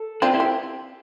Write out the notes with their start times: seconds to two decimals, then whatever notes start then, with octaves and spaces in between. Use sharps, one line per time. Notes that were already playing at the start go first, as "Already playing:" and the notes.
Already playing: A4
0.22 C4 D4 F4
0.34 E4 G4
0.40 C4